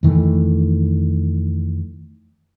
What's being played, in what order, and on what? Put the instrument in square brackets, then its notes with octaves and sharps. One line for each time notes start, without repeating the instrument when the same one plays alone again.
[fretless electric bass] F2 D#3 E3 A3